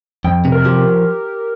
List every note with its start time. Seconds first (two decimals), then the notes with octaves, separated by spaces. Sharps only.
0.24 F2 G5
0.45 C3
0.52 A#4
0.65 F3 G4